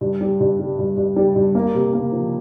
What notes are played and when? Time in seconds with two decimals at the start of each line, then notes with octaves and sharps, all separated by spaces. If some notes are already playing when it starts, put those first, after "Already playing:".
0.01 G2
0.21 G3
0.40 G2
0.59 G3
0.79 G2
0.97 G2
1.16 G3
1.36 G2
1.55 A#3
1.75 C3
1.93 A#3
2.12 F3